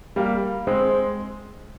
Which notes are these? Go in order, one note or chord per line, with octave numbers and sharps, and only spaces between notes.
G3 A#3
G#3 C4